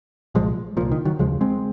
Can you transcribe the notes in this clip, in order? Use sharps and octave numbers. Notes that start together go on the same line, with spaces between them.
C2 A#2 F3 G#3
C2 A#2 F3
D#3
D#3 F#3
F1 D#2 C#3 F3 G#3
G#3 C4